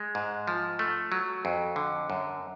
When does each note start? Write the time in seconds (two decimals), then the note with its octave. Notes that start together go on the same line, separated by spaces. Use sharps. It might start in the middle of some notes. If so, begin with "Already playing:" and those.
Already playing: G#3
0.15 G#2
0.48 F3
0.79 A3
1.12 F#3
1.45 F2
1.76 D3
2.10 F#2